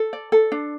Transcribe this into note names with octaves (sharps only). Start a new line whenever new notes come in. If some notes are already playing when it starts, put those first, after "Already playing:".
Already playing: A4
D5
A4
D4